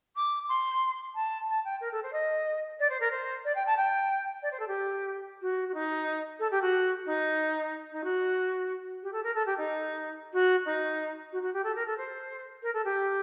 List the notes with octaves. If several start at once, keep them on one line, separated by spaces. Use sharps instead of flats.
D6
C6
A5
A5
G5
A#4
A4
C5
D#5
D5
C5
A#4
C5
D5
G5
A5
G5
D5
C5
A4
G4
F#4
F#4
D#4
A4
G4
F#4
D#4
D#4
F#4
G4
A4
A#4
A4
G4
D#4
F#4
D#4
F#4
F#4
G4
A4
A#4
A4
C5
A#4
A4
G4